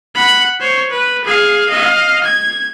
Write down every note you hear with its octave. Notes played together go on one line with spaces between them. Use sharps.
F#5 B5
C5 C#5
B4
G#4 F5
D#5 F5
G#6